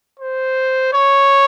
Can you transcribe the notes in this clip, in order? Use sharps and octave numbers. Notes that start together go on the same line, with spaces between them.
C5
C#5